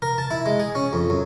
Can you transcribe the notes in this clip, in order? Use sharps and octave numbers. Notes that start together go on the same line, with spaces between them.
A#4
A5
E4
G#3
G#4
C#4
F2
F#2